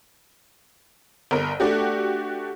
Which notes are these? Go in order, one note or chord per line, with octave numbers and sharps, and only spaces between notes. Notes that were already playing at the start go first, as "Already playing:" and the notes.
G1 A#4
A3 D4 F#4 G4